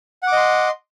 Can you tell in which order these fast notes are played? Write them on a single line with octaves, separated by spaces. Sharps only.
F#5 D6 D#5 C6